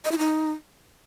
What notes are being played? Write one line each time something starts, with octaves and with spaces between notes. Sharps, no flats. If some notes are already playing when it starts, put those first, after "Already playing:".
D#5
E4
D#4